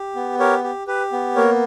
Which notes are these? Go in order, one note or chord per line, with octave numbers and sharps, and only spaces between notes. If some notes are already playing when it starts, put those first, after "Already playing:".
Already playing: G4
B3
G4 A#4 C#5
G4
G4 B4
B3
A#3 A#4 C#5